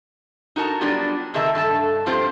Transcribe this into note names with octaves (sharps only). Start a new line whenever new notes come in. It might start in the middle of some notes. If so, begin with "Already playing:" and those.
D#4 F#4 A#4 A5 A#5
F#3 G3 B3 D4 F4 G4
C3 D#3 G#4 A#4 E5 A5
G2 A4 A5
G2 F3 C4 F4 G4 C5